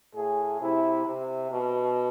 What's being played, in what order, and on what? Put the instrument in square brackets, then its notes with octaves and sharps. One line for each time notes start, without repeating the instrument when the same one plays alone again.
[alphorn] A2 [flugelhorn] G#4
[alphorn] C3 [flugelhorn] E4
[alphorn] C3
B2